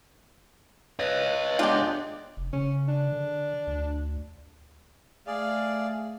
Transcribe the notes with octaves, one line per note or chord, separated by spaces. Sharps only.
B4 C#5 D#5
G#3 B3 D4 F4 G4 G5
F1
C#3 C#4
D4
D3
D2
A3 G#4 D5 F5